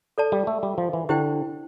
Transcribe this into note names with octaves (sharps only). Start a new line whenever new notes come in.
A4 D5 A5
G3
A3
G3
F3
E3
D3 E4 G4 C5 G5